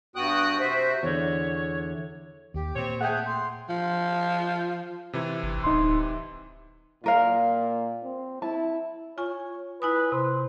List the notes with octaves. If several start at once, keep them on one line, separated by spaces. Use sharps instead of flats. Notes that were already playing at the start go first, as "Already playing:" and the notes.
G2 B3 F#4 G5 D#6 F#6
C3 F#4 C5 E5
E2 D3 C#5
D#2 G4
A#2 C4 C#5
A3 G#4 F#5 G5
C6
F3
C3 E3 E4
G1
D1 D#4 C6
A#2 F4 A#4 F5
C4
E4 A5
F4 C#5 G#5 C#6
E4 B4 G#5 D#6
C3 C5